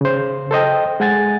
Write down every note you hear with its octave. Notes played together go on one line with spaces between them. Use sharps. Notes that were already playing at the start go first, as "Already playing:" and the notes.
C#3 C5
A4 C5 D#5 G5
G#3 F#5 G#5 A6